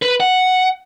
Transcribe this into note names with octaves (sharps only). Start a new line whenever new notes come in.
B4
F#5